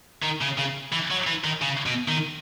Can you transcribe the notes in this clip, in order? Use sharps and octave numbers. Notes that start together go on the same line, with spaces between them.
D#3
C#3
C#3
E3
F#3
E3
D#3
C#3
B2
D#3